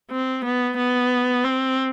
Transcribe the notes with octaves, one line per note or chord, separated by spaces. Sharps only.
C4
B3
B3
C4